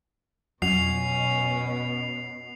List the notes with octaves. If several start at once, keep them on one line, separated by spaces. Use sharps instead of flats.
F2 B2 F#3 C#4 C7 F7